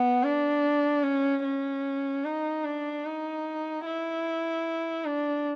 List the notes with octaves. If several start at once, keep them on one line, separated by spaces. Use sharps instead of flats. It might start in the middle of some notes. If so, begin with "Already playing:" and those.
Already playing: B3
D4
C#4
C#4
D#4
D4
D#4
E4
D4